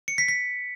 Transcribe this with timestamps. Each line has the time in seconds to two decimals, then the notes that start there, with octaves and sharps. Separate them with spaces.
0.08 C#7
0.18 B6
0.28 B6